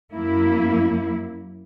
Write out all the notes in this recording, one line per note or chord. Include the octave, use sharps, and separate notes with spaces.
F#2 A#3 E4